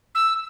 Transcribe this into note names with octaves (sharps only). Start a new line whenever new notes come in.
E6